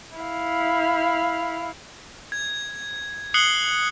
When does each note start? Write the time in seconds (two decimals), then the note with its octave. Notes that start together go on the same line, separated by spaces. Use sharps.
0.16 E4 F5
2.32 G#6
3.34 D#6 F#6 C7 C#7 F#7 G7